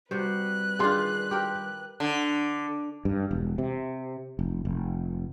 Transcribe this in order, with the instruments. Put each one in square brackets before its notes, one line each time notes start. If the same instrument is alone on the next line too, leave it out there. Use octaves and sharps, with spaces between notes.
[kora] C3 F#4 C5 [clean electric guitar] G3 [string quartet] B4 F#6
[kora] D#3 D4 F4 [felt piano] G#4 C6
[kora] G4 A#4
[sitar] D3
[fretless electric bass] G2
E1
C3
F1
F1